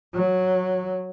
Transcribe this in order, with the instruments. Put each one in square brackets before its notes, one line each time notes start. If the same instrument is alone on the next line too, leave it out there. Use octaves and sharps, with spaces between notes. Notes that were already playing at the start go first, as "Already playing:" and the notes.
[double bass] F#3